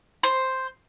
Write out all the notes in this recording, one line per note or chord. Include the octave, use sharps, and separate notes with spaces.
C5